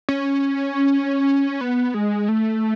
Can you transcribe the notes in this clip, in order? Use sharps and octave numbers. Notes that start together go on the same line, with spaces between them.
C#4
B3
G#3
A3